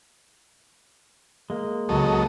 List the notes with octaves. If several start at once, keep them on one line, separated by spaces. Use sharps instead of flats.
G#3 A#3
C#2 F#3 A4 D#5